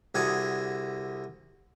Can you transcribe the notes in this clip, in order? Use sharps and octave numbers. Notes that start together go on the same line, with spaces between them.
C2 D3 F#4 G#4